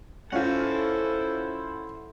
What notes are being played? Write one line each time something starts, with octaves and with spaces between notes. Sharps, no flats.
C#4 E4 F4 A4 C5 F#5